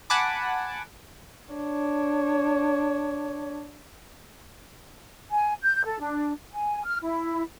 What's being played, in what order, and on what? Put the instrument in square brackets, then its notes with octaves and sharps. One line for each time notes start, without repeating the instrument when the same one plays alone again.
[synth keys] F#5 G#5 A5 B5 D6
[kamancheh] D4 C#5
[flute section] G#5
G6
A4
D4
G#5
F6
E4